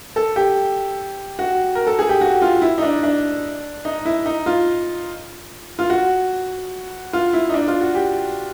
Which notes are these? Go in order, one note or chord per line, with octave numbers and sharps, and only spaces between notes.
A4
G4
F#4
A#4
A4
G#4
G4
F#4
F4
E4
D#4
D4
D4
D#4
E4
D#4
F4
F4
F#4
F4
E4
D#4
D4
F4
F#4
G4